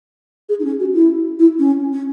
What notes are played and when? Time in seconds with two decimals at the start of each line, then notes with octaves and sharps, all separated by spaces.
0.49 G#4
0.59 D#4
0.64 C#4
0.80 F#4
0.94 E4
1.39 E4
1.59 C#4
1.93 C#4